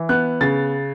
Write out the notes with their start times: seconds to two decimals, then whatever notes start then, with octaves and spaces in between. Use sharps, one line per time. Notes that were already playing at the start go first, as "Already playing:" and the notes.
Already playing: E3
0.09 B3 F#6
0.41 C#3 A6